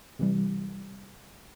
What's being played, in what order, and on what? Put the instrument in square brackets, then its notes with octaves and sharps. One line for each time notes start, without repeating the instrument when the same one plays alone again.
[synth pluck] C3 E3 G3